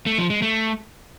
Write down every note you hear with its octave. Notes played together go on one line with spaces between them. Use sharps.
A3
F3
G#3
A3